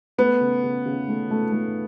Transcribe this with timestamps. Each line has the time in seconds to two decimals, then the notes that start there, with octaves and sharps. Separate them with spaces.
0.18 A3 B3
0.40 C#3
0.63 C#3
0.86 C#3
1.08 A3
1.30 A3
1.52 A3